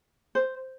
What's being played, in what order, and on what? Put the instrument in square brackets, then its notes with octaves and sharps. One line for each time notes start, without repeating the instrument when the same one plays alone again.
[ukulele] C5